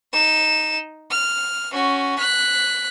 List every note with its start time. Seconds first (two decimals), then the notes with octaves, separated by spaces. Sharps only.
0.12 D#4 E7
1.11 F6
1.72 C#4 F#4
2.18 F#6 B6